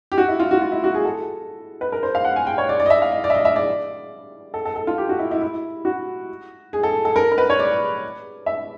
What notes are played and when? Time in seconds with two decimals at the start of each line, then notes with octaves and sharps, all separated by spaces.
0.12 G4
0.18 F#4
0.28 E4
0.40 F4
0.51 F#4
0.62 F4
0.72 E4
0.84 F#4
0.95 G#4
1.05 A4
1.81 B4
1.92 A#4
2.03 C5
2.15 F5
2.25 F#5
2.36 G#5
2.47 G5
2.58 C#5
2.69 D5
2.80 D5
2.86 D#5
2.90 E5
3.02 F5
3.12 D#5
3.24 D5
3.30 E5
3.34 D#5
3.45 E5
3.56 D5
4.54 A4
4.65 A4
4.76 A4
4.87 F4
4.98 G4
5.09 F#4
5.19 E4
5.31 E4
5.41 E4
5.85 F#4
6.73 G#4
6.83 A4
7.05 A4
7.16 A#4
7.32 A#4
7.38 B4
7.50 C#5
7.59 D5
8.46 E5